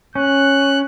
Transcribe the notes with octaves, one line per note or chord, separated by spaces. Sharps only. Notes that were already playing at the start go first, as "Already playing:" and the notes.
C#4 F#6